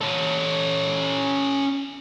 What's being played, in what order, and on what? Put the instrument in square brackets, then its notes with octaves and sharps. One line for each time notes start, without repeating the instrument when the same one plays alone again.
[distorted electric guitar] C#4 A4